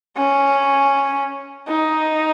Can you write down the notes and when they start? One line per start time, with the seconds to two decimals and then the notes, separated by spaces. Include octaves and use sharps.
0.17 C#4
1.68 D#4